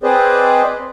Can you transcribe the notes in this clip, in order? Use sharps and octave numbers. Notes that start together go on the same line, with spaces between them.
C4 G#4 B4 C5 D5 D#5